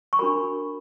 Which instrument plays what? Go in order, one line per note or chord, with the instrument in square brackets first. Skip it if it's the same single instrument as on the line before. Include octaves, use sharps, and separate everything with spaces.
[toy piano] C#6
D4 F#4 A#4 B5